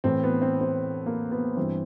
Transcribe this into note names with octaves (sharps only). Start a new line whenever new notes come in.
A2 E3 C4
B3
C4
C4
A#3
B3
G2 E3 C4